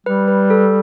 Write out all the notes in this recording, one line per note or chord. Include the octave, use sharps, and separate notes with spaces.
G3 B4
B4
A4